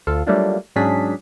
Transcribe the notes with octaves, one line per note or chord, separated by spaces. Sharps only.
D2 F4 A4 F5
F#3 G3 A3 A#3 D4 F4
G#2 F#3 C#4 D4 G#4 B6